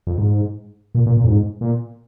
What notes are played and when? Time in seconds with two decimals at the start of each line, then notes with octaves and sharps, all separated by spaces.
0.07 F2
0.18 G#2
0.95 A#2
1.06 A#2
1.17 A#2
1.23 F2
1.28 G#2
1.61 A#2